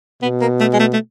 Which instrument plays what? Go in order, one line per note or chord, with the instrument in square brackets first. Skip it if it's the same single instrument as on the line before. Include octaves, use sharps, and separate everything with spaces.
[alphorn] B2 [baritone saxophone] B3
[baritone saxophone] A#3
A3
G#3
A3
A3